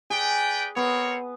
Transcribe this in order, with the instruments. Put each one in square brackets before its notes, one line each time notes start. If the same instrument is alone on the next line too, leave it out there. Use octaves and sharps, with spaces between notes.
[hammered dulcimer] G#4 [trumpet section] B4 D5 G5
[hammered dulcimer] B3 [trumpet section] C4 A#4 C#5